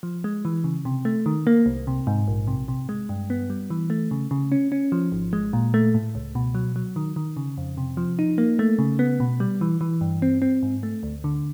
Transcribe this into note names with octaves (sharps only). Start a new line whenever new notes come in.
F3
G#3
E3
C#3
C3
A3
D#3
A#3
C2
C3
G#2
A#1
C3
C3
G#3
G2
B3
G3
E3
A3
C#3
C#3
C#4
C#4
F3
G#1
G#3
A#2
A3
A2
C#2
B2
F#3
F#3
D#3
D#3
C#3
F2
C3
F3
D#4
A#3
A3
C#3
B3
B2
G3
E3
E3
G2
C4
C4
G#2
A3
D2
D3